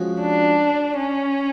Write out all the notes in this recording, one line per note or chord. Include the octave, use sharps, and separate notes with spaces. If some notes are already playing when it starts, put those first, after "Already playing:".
Already playing: F3 G#3 C#4 F#4
D4
C#4